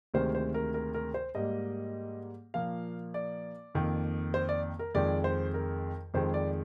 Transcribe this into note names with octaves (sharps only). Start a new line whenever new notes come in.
D2 C3 D#3 G#3 C5
C5
A#4
A#4
A#4
C5
G#2 G3 A#3 D#5
A#2 F3 A#3 F5
D5
F2 D#3 A#3
C5
D5
A#4
F2 D#3 G#3 D5
C5
A#4
F2 D#3 G#3 C5
D5